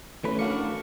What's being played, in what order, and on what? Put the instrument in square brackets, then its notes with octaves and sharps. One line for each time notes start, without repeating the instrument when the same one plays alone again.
[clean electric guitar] E3 F#3 B4 [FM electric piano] A3 C#4
[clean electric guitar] E3 A3 F#4 [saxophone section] D4 A#4 [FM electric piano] F5 C#7